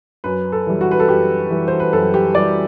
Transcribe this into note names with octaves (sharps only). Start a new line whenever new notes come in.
F#2 B4
A4
E3 G3
F#4
B4
A4
F#2 G4
E3 G3
C5
B4
F#2 A4
G4
E3 G3 D5